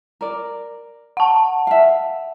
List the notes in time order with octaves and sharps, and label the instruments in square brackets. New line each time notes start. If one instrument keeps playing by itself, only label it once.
[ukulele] A#4 D5
[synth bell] F#5 A5
[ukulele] E5 F5